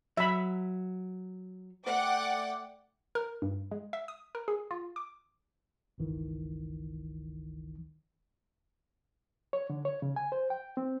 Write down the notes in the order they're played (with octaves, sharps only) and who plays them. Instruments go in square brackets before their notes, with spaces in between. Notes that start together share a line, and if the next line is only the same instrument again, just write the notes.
[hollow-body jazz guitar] F#3 [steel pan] E5 B5
[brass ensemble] A3 D5 [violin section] F#5 G5 D6
[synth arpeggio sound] A#4
G2
G#3
E5
D#6
A#4
G#4
F4
D6
[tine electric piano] G1 C#2 D#3 E3
[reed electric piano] C#5
D3
C#5
C#3
G#5
C5
G5
C4